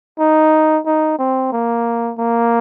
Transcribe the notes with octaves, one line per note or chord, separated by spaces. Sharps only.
D#4
D#4
C4
A#3
A#3